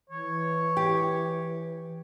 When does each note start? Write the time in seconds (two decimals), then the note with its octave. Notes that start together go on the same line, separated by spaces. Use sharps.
0.09 E3 C#5
0.77 G4